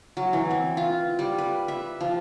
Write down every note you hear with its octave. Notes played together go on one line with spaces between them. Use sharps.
F#3
E3
C4
F4
G3
B4
E5
F3